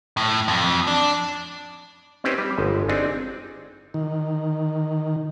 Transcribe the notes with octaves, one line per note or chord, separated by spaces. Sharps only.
A2
F2
D4
C4 C#4 D#4 G4 B4 C5
G3
G1 G#3
C4 D4 D#4 G#4 D5
D#3